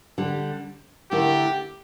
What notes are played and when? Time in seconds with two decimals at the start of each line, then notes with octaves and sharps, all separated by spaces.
0.18 D3 G3 D4 G4
1.11 D3 A3 E4 G4 A#4